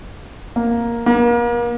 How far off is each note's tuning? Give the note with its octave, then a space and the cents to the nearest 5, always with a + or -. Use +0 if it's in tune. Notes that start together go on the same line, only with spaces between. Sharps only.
A#3 +5
A#3 +35